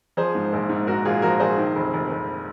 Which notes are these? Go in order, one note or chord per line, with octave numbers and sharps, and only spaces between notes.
F3 G#4 C5
G#2
A#1
G#2
G#2 F#4 A#4
A#1 F4 G#4
F3 F#4 A#4
A#1 G#4 C5
D#3
F1
F1
F1